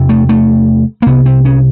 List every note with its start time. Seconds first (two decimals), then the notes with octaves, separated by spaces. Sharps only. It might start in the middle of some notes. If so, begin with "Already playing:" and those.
Already playing: E2 C3
0.09 A3
0.29 A3
1.02 A#3
1.06 C2 C3 B3
1.26 C4
1.45 C#4